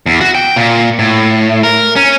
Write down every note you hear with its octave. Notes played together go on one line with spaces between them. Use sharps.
E2
F#4
G5
A#2
A2
A#4
C#4